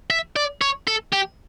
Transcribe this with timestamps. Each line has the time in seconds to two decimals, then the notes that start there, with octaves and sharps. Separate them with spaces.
0.10 E5
0.36 D5
0.61 C#5
0.88 A4
1.13 G4